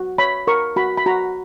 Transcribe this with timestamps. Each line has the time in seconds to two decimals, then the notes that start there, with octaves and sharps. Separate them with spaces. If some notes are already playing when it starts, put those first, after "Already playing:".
Already playing: F#4
0.18 C#5 B5
0.47 A#4 C#6
0.76 F#4 B5
0.97 B5
1.06 F#4 A#5